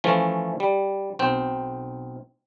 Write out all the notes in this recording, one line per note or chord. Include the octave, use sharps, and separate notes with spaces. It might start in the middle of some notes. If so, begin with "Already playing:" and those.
E3 F3 A3 C#4
G3
B1 C4 G5